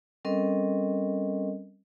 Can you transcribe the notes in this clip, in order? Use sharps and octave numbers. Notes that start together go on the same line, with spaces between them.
G3 C4 C#4 A4 A#4 D#5